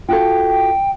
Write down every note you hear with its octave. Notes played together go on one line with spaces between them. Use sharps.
F4 F#4 A4 G5